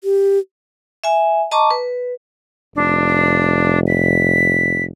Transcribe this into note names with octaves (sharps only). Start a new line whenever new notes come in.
G4
E5 G#5
D#5 A5 A#5 C#6 D6
B4
F1 D4
B6